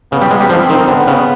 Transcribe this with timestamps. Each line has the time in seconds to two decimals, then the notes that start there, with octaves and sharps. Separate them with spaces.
0.12 C#3 B3
0.21 G3
0.31 G#3
0.40 G3
0.50 F3 C4
0.69 D#3
0.88 D3 B3
1.07 C#3